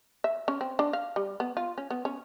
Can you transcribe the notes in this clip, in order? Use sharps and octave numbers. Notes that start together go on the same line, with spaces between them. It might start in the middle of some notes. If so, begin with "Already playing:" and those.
E5
C#4
C4
D4
F5
G3
B3
F4
C#4
B3
C#4